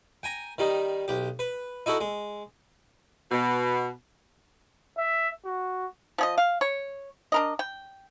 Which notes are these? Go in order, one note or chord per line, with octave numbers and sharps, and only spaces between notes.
G5 G#5 A#5
D#3 G3 D#4
B1 G4
B4
D#4 E4 F#4 A4
G#3
B2
E5
F#4
F3 G#4 D#5
F5
C#5
D4 A#4 D#5
G5